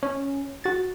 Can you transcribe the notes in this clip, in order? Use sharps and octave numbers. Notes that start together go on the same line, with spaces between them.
C#4
F#4 A6